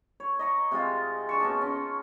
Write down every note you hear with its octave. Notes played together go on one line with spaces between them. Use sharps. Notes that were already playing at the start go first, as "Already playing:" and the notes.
C#5
D#5 A#5 C#6
C3 G#3 F4
D4 A5 C#6
B2 C#4 D#4
C#4